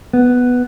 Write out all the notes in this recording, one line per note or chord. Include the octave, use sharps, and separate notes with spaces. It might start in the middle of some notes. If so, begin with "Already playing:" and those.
B3